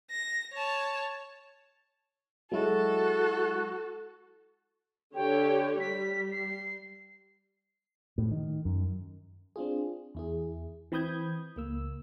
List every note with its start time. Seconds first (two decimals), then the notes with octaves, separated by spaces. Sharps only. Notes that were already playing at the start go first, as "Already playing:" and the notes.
0.11 A#6
0.53 C#5 A5
2.52 F#3 G#3 E4 F#4 A4
5.15 D3 G4 C#5 G5
5.80 G3 B6
6.32 C7
8.18 A2
8.31 D#3
8.65 F#2
9.56 C4 D4 F4 G#4
10.15 E2 E4 G#4
10.92 E3 C4 B5 D#6 G6 G#6
11.56 C#2 A#3 E6